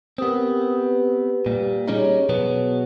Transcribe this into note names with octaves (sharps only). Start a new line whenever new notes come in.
B3 C4 G4 A#4 D#6
G4 B4
A#2 G3
G3 C#4 D#4 G#4 C#5
B2 F#3 B3